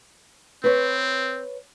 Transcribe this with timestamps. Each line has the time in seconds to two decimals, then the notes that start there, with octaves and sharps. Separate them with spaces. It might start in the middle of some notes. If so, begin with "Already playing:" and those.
0.64 C4 B4 C#5